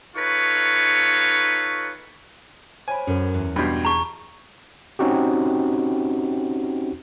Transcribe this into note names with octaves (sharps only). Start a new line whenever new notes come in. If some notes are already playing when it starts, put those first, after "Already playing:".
D#4 F4 A4 B4 C#5 C#6
C5 C#5 G#5 B5
F#2 C#4 A4 A#4
E2
G2 B2 B5 C6 F6 G6 G#6
G#4 A5 A#5 C#6
C4 C#4 D#4 F#4 G4